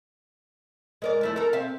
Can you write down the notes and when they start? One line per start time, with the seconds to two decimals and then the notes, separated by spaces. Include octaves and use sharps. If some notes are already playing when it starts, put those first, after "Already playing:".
1.02 G#3 A#4 D5
1.21 F2 A3 E4
1.36 A4 A#4
1.53 C4 E5 F5